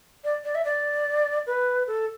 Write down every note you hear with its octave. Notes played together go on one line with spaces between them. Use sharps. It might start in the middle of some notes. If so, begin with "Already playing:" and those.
D5
D5
E5
D5
B4
A4